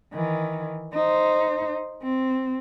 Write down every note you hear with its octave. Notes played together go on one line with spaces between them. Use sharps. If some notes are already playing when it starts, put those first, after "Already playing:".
D#3 E3
D#4 C5
C4